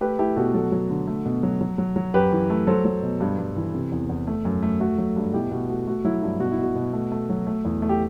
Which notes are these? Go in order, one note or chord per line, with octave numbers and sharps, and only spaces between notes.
A3 G4 B4
A3 E4 G4
B2 F#4 A4
F#3 F#4 A4
F#3
D3
A3
B2
F#3
F#3
F#3
F#3
F#2 G4 B4
E3
A3
F#3 A4 C5
F#3
B2
G2
G2
E3
C3
E2
E2
A3
F#2
A3
A3 F#4 A4
F#3
G2
B2 E4 G4
B2 F#4
A3 F#4
A3 F#4
F#3 E4
G2 E4
B2 F#4
E4
B2 F#4
B2
A3
A3
F#3
A3
E2
A3
G4